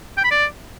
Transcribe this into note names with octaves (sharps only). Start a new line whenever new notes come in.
G5
B5
D5